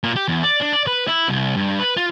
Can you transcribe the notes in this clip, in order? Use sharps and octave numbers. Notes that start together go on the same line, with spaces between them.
A#2
G4
E2
D5
D4
D5
B4
E4
C2
G2
B4
F4